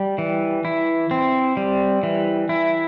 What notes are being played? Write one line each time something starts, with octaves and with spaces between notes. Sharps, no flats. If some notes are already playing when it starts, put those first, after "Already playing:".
Already playing: G3
E3
E4
C4
G3
E3
E4